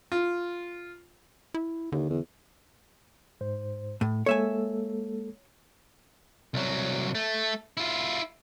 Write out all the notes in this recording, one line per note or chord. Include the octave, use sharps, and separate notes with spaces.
F4
E4
D#2 D3
E2
G#2 C5
A2
G#3 A#3 A4 C#5 E5 G#5
C2 F#3
A3
E4 F4